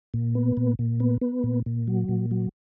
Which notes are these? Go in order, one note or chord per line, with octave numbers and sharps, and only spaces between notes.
A#2
B3
A#2
A#2
B3
B3
A#2
A#2
F#3
A#2
F#3